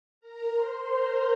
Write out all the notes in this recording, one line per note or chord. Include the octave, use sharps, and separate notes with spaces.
A#4 A#5
C5 C6
A#4 A#5